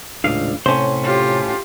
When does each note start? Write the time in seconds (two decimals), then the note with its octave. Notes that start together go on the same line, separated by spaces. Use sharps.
0.24 D#1 C#2 A2 D4 F5
0.66 A2 C3 C#4 C5
1.03 F4 G4